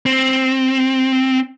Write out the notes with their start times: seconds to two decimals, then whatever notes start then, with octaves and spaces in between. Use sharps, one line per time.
0.06 C4